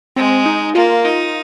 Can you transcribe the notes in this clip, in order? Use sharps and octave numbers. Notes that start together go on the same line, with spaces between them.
G#3 C4
D#4
A#3 F4
D#4